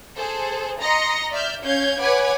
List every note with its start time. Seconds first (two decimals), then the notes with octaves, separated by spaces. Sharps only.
0.17 G#4 A4 C5
0.80 D#5 A#5 C6 A#6 C#7
1.32 D5 E5 F6 G6
1.63 C#4 C#5 F5 G6 G#6
2.00 B4 C#5 F#5 G#5 D6 G#6